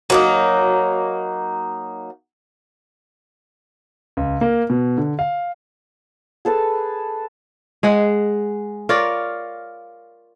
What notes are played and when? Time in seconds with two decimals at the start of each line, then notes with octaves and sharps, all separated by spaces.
0.10 F#3 A#3 D#4
4.17 C#2
4.41 A#3
4.70 B2
4.98 D3
5.19 F5
6.45 G#4 A4 B4 A5
7.83 G#3 G#4 F#5
8.89 F4 A#4 C#5 D5